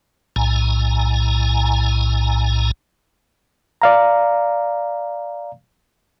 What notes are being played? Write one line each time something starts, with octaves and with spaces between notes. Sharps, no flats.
B1 A2 G#5 A#5
D5 F5 A#5